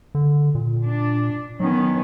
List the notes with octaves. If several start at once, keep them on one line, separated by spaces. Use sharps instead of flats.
D3
A#2
D4
D#3 F#3 B3 C#4